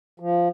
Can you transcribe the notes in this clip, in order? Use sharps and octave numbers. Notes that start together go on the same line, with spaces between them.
F3